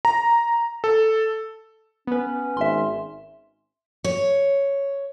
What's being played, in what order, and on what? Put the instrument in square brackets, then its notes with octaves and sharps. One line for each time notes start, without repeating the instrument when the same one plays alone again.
[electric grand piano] A#5
A4
[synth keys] B3 B4 [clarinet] C#4
[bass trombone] G#1 [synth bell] E5 C6
[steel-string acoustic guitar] C#5